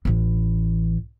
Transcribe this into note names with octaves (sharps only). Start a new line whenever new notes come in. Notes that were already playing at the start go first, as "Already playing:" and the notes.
A1 E3